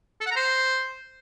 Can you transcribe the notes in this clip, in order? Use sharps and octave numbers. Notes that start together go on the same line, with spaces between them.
A4
F#5
A#5
C5